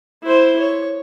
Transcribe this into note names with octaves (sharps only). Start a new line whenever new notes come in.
E4 C5
C#5